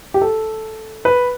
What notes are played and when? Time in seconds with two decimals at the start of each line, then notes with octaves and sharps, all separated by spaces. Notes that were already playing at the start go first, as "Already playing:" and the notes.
0.14 G4
0.22 A4
1.05 B4